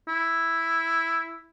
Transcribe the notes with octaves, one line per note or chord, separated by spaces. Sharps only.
E4